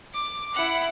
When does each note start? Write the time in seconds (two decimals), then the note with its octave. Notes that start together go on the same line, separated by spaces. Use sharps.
0.13 D6
0.54 E4 F#5